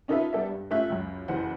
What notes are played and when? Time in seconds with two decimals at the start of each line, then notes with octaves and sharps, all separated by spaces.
0.08 C#4 D#4 F4 A4 B4 E5
0.33 G3 B3 A4 D5 E5
0.49 G2
0.71 A3 C#4 F4 E5 F#6
0.90 C#2 F#2
1.28 F#1 E3 C5 F#5